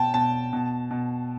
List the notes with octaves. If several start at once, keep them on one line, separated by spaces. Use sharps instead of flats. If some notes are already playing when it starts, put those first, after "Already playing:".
Already playing: B2 G5 A5
B2 A5
B2
B2